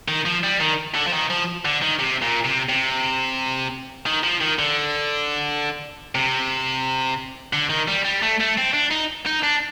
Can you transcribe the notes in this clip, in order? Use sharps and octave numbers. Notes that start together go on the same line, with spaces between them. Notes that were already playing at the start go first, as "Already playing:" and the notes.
D#3
F3
G3
D#3
D3
F3
D#3
F3
D3
D#3
C3
A#2
C3
C3
D#3
F3
D#3
D3
C3
D3
D#3
G3
G3
A3
A3
C4
D4
D#4
D#4
D4